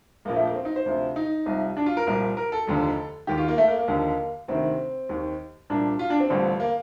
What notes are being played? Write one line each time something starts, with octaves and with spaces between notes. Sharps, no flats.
A#1 A#2 F3 A#3
A3
A#3
C4
D#4
C5
D2 C3 F3
D#4
C2 C3 F3
D4
F4
A#4
C2 A#2 F3 A#4
A#4
A4
F1 D#2 D3 F3
D#2 D#3 G4
F4
A#3
A3
A#3
A#3
D#2 D3 F3
D2 C3 D#3 C4
D#2 D#3
C2 A#2 F3 D4
F4
D4
C4
A1 G2 D3 F3
A#3